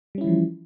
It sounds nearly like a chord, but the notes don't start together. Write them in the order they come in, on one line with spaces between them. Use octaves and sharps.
G3 C#4 E4 E3 F3